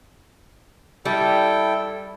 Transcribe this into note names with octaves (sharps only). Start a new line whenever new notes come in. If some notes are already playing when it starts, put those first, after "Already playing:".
G3 E4 A4 G5